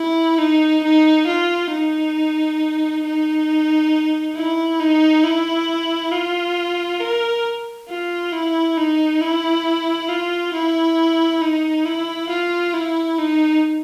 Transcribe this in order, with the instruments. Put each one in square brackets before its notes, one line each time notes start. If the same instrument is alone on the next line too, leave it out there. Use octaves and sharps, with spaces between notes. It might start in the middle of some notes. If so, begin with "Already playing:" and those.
Already playing: [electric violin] E4
D#4
D#4
F4
D#4
D#4
E4
D#4
E4
F4
A#4
F4
E4
D#4
E4
F4
E4
D#4
E4
F4
E4
D#4